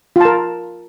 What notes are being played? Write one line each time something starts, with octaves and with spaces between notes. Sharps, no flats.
F4 A#4 A5